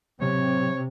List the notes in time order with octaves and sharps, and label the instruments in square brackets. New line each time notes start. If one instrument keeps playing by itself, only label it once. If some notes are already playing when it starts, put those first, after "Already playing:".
[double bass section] C3 [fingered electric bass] F#3 C4 [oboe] C#5